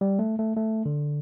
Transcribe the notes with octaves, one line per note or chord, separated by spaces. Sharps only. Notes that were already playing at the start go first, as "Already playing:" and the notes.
G3
A3
A3
A3
D3